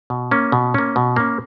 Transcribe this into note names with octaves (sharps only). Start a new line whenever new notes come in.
B2
A#3 C#4
B2
A#3 C#4
B2
A#3 C#4